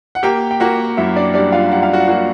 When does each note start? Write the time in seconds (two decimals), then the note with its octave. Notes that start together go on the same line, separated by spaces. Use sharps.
0.15 F#5
0.23 A#3 G4 G5
0.51 G5
0.60 A#3 F#4 F#5
0.97 F#2 E4 E5
1.16 D4 D5
1.34 G3 D4 D5
1.52 F4 F5
1.71 G3 F#5
1.83 F5
1.93 F#4 F#5
2.08 A#3 F#4 F#5